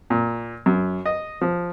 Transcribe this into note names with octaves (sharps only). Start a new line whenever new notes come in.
A#2
F#2
D#5
F3